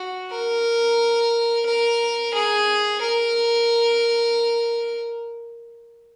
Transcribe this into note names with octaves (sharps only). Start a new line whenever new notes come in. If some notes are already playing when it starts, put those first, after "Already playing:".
Already playing: F#4
A#4
A#4
G#4
A#4